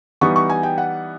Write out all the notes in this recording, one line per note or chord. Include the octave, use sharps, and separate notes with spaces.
E3 G3 B3 D#4 C#6
C#6
G#5
G5
F#5